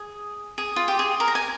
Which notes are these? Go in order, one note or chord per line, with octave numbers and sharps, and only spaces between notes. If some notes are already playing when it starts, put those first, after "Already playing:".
Already playing: G#4
G#4
F4
G4
G#4
A#4
A#5
G#5